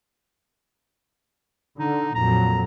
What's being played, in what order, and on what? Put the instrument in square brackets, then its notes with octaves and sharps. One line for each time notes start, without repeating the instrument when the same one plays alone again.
[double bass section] D3 [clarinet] D#4
[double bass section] F2 A#2 F#3 [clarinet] A#5